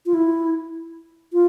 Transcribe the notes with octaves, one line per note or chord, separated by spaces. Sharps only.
F4
E4
F4